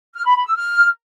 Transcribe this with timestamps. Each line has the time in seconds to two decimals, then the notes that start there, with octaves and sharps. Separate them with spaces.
0.14 F6
0.24 B5
0.35 B5
0.45 E6
0.56 F6